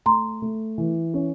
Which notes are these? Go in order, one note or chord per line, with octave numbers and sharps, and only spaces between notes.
A3 A#5 C6
A3
E3
C#4